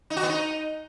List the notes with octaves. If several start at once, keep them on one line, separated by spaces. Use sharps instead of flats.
D#4
F#4
B3
D#4